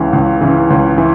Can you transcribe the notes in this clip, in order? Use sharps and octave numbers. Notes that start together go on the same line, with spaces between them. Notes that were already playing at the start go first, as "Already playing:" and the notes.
Already playing: C#2 C#3 E3
C#2
C#3 E3
C#2
E3